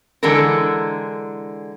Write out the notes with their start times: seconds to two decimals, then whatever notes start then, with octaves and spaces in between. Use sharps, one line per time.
0.23 D3 E3 G#3 A4 A#4